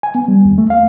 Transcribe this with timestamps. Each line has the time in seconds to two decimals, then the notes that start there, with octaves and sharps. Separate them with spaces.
0.03 G#5
0.15 B3
0.28 G3
0.45 D#2
0.58 A3
0.70 F5